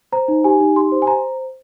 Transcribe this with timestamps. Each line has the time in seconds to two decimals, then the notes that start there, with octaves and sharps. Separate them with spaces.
0.12 C5 A#5
0.28 D#4
0.44 G4 G#5
0.60 D#4
0.76 G4 C6
0.92 C5
1.02 G#5
1.07 C5 A#5